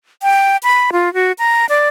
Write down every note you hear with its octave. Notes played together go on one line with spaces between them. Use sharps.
G5
B5
F4
F#4
A#5
D5